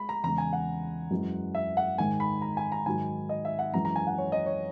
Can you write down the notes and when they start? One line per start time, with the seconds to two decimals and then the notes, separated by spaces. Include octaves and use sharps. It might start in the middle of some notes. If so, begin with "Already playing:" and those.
Already playing: G#3 B5
0.09 A#5
0.24 E2 C#3 G#3 A#5
0.38 G#5
0.53 F#5
1.11 F#2 E3 G#3
1.55 E5
1.77 F#5
1.98 G#2 D#3 G#3 G#5
2.20 B5
2.42 A#5
2.57 G#5
2.72 A#5
2.86 G#2 D#3 F#3 G#5
3.29 D#5
3.45 E5
3.59 F#5
3.73 F#2 E3 G#3 A#5
3.85 A#5
3.96 G#5
4.07 F#5
4.18 C#5
4.32 D#5
4.46 C#5